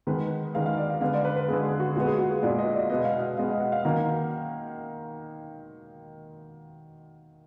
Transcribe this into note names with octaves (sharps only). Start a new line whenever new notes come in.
D#3 G#3 B3 B4
D#3 G#3 B3 F5
F5
D5
F5
D3 G#3 B3 F5
D5
B4
B4
D3 G#3 B3 G#4
G#4
F#4
A#2 G#3 B3 F#4
G#4
F#4
G#4
A#2 G#3 B3 D5
D#5
D5
B2 G#3 B3 D#5
F5
F5
B2 G#3 B3 F5
D#5
F#5
F5
D#3 F#3 A#3 F5